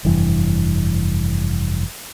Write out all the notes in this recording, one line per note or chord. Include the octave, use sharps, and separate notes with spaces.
F1 G2 E3